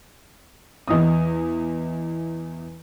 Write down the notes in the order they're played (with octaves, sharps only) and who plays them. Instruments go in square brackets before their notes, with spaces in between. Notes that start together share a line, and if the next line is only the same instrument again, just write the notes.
[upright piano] E2 D#5 D#6